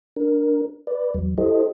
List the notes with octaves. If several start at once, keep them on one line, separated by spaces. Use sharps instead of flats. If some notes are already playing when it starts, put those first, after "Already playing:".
D4 A#4
B4 D5
E2 F#3
E4 G4 A4 C5 D#5